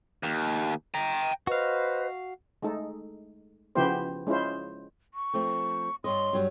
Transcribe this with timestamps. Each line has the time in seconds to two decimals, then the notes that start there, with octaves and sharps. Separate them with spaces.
0.23 D#2
0.94 G5 A#5
1.47 F#4 B4 C5 D#5 F5
2.62 G#3 A3 D#4 A4
3.75 C#3 F3 B3 E4 G4 C5
4.27 G#3 C#4 E4 F4 C5
5.14 C#6
5.34 F3 A3 C4
6.04 G2 C#5 D#5 C6
6.33 G2 F#3 G3